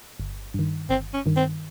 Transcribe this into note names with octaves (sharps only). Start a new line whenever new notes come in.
G1
G2 D#3
G1 C4
C#4
G2 D#3
C4